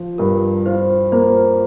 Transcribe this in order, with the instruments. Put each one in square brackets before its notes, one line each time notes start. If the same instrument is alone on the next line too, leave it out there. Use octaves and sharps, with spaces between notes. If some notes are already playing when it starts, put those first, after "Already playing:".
Already playing: [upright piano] F3
[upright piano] G2 [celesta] A#4
[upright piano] F4 [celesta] C5
[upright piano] A#3 [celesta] C5